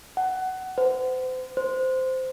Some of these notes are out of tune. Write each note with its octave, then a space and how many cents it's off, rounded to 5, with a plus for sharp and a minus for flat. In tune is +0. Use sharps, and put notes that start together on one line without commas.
F#5 +20
C5 -35
C5 -10